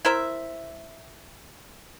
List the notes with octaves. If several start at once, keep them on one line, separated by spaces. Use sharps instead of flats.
E4 A#4 C5 E5